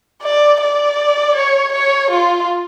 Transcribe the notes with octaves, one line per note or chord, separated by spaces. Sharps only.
D5
D5
C#5
C#5
F4